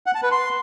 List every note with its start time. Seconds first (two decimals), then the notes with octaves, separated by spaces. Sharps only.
0.06 F#5
0.15 A5
0.23 B4
0.31 C6